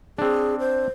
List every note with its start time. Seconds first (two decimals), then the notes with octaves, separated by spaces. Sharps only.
0.18 C4 D4 G#4
0.60 C5